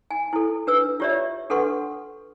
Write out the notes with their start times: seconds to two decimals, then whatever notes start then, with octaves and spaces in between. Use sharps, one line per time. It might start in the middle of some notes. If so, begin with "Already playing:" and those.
0.11 G#5
0.33 E4 A4
0.67 D4 B4 E6
1.00 F4 G4 C#5 D5 E5
1.50 D4 A4 B4 F#5 C6 C#6